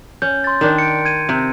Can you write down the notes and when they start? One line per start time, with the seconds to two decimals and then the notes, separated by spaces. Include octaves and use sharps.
0.22 C#4 G6
0.44 C6 A6
0.61 D#3 D4
0.78 C#7 D7
1.05 G#6 D#7
1.29 C3